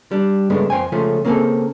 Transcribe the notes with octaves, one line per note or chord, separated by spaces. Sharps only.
G3 D4
G2 C#3 G#3 A3 B3 D4
F2 C5 G5 G#5
C#2 C#3 F3 A3 C#4
C#3 A#3 C4 F#4 G#4 A4